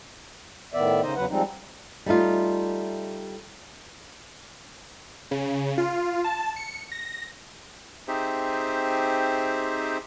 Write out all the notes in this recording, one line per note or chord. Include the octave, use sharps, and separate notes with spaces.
A2 D#3 B3 D5 E5
C#3 D#4 C5 D#5
E2 C#3 F#3 B4 F#5
F3 G3 G#3 C4 D#4
G3 A3 D#4 F4
C#3
F4
A5
C#7
A#6
C4 D#4 G4 G#4 C5 E5